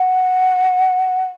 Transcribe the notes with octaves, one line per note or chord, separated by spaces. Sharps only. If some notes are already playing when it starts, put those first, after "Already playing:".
Already playing: F#5